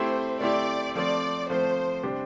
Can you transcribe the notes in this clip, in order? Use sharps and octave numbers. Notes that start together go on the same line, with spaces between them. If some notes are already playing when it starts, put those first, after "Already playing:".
Already playing: A3 C4 E4 G4 C5
A3 C4 E4 G4 D5
F3 A3 C4 D5
F3 A3 C4 C5
C3 G3 D4 G4 C5